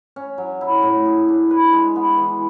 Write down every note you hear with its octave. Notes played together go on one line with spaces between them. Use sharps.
C#4
F#3
E4
A2
G#4
D4
B4
G#3
B3
E3